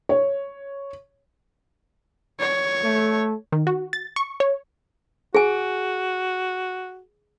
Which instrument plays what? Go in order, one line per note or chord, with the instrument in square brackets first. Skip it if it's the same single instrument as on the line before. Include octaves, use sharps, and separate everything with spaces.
[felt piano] C#5
[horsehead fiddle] C#5
[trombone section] A3
[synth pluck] D#3
F#4
A6
C#6
C#5
[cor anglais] F#4 [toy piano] G#4 G#5